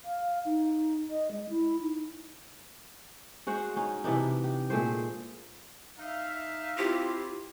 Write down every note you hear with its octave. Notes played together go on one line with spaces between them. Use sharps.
F5
D#4
D#5
G#3
E4
D#4
G#3 F#4 C5 F#5
C#4 D#4
C3 E3 D4 D#4
G4
A#2 G#3 A3 C5
D#4 E5 F5
C4 E4 F4 G4